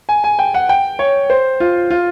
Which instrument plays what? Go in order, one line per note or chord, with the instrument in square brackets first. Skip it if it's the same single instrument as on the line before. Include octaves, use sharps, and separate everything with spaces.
[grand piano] G#5
G#5
G5
F#5
G5
C#5
C5
F4
F4